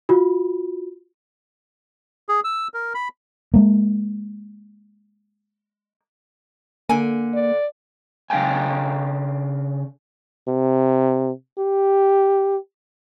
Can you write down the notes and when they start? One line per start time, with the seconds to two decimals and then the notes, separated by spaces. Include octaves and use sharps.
0.09 F4 F#4
2.29 G#4
2.44 E6
2.74 A#4
2.94 B5
3.54 G#3 A#3
6.89 D3 A#3 G#5
7.34 D5
8.30 C#3 D4 A#4 F5 G5 G#5
10.48 C3
11.58 G4